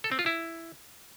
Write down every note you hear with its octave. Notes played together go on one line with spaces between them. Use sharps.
A4
C4
F4
E4